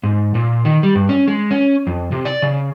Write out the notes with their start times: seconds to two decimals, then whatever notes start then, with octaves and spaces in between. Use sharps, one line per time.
0.03 G#2
0.35 A#2
0.65 D#3
0.83 G3
0.95 G2
1.09 C#4
1.28 G#3
1.51 C#4
1.87 F2
2.12 C3
2.25 D5
2.42 C#3